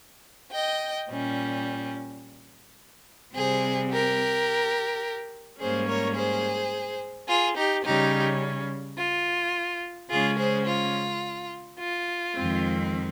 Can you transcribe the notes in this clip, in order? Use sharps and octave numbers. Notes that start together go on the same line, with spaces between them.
D#5 G5
A#2 G3 C#4
C3 G3 C4 G#4 C5
G4 A#4
G#2 G3 A#3 C#4 G#4 C5
A#4 C#5
G#4 C5
F4 G#4
D#4 G4
C#3 G3 C#4 D#4 G4
F4
C#3 G#3 C#4 F4 G#4
G#4 C5
F4
F4
F2 D#3 G#3 C4